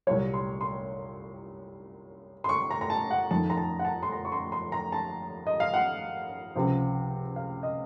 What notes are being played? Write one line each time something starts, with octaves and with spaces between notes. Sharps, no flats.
C2 A#2 F#3 C#5
C6
C6
C6
C#6
A#5
A#5
A5
F#5
F2 D#3 A#3 A5
A#5
A5
F#5
A5
C6
A#5
C#6
C6
C6
A#5
A5
D#5
F5
F#5
C#2 C3 F3 C4
F5
D#5